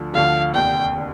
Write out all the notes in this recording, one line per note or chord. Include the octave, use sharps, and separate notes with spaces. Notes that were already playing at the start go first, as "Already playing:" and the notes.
Already playing: D2 D3 F3
D2 D3 F3 F5
F1 D#2 D3 G5
D3